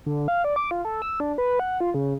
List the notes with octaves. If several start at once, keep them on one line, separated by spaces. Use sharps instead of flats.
D3
F5
D5
D6
F4
A4
E6
D4
B4
F#5
F4
C#3